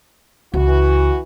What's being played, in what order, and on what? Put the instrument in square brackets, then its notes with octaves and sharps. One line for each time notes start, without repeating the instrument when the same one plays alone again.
[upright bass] C#2 [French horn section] E3 F#4